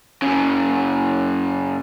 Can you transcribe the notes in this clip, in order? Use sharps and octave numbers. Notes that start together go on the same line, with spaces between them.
F#2 C#3